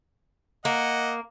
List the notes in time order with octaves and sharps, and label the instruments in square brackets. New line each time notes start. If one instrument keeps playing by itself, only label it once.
[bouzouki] A#3 [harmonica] D#5 F#5